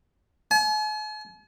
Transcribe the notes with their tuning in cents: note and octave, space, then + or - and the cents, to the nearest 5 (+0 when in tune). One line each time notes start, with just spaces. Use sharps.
G#5 +45